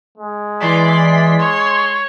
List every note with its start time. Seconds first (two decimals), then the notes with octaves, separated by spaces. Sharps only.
0.18 G#3
0.60 E3 D5 C6 B6
1.39 C#5 C6